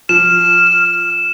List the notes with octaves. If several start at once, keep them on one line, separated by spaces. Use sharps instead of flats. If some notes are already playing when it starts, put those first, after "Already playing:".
F3 F6 E7